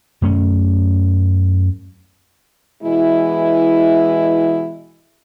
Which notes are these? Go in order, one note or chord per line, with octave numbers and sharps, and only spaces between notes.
F#2 A3 C#4
B2 E3 G#3 E4